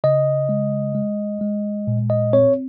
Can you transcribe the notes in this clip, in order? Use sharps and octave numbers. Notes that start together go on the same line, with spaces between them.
C#3 D#5
G#3
G#3
G#3
A#2
D#5
C4 C#5